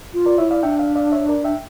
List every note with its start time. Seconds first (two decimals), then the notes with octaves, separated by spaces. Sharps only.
0.14 F4
0.26 A#4 D5
0.38 E4 C#5 E5
0.51 D5 F5
0.63 D4 E5 G5
0.79 D5 F5
0.96 D5 F5
1.12 C#5 E5
1.29 A#4 D5
1.45 E5 G5